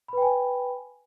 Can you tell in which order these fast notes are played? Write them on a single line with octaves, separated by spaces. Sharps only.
B5 B4 G5 G#5